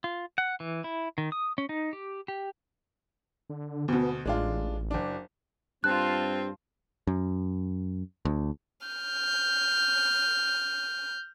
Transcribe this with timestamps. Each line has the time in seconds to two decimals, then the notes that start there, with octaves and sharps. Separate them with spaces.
0.04 F4
0.38 F#5
0.60 E3
0.84 E4
1.18 D#3
1.32 D#6
1.58 C#4
1.69 D#4
1.93 G4
2.28 G4
3.50 D3
3.88 D2 B2 B3
4.25 A1 G#3 D4 F4
4.91 F#1 D4
5.84 G2 C4 F4 A5 F#6
7.07 F#2
8.25 D2
8.87 F6 G6